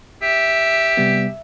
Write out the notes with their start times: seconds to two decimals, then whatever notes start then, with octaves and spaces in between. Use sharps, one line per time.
0.23 G4 E5
0.97 C3 G3 B3